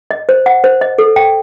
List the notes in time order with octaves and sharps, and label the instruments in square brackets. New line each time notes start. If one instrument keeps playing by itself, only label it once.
[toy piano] D#5
C5
F#5
C5
D#5
A4
G5